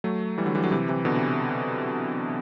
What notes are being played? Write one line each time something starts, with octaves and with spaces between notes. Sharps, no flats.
F#3 A3
E3 G3
D3 F#3
E3 G3
D3 F#3
C3 E3
C3 E3
B2 D3
C3